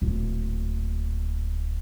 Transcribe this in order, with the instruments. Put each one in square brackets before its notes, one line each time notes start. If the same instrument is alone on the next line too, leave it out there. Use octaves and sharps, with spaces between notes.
[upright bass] D1 A#2